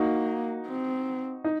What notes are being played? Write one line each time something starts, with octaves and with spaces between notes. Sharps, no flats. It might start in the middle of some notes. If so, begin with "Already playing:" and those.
Already playing: A#3 D#4 F#4
C4
D#4